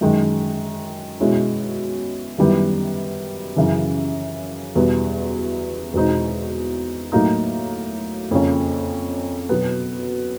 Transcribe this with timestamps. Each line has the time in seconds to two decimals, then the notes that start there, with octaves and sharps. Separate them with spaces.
0.01 F#2 D#3 G#3
1.20 B2 G#3 C#4 E4
2.38 F#2 D#3 G3 B3 E4
3.56 F#2 C#3 E3
4.75 E2 B2 G3 B3
5.94 E2 B2 G#3 C4 D#4
7.12 A2 F#3 A#3 D#4
8.31 F2 C#3 F3 A#3 C#4
9.49 B2 F#3 B3